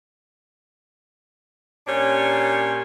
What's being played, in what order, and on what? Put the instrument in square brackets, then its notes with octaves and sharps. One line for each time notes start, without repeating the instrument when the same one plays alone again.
[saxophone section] A#2 C#4 D4 G4 C#5